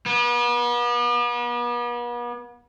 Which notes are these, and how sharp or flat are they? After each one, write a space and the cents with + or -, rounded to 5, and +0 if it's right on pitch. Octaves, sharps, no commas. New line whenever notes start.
B3 -40